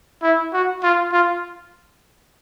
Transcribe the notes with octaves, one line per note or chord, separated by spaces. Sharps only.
E4
F#4
F4
F4